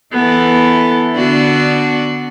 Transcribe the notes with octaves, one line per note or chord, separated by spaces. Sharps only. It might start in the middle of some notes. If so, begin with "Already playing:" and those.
E3 B3 E4 A4
D3 B3 D4 F#4